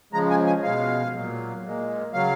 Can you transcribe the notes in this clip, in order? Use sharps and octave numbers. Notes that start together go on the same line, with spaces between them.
C#3 F3 G#3 A#5
G#5
G#5
B2 G#3 F5
A#2 F#3
A#2 G#3
C#3 F#3 F5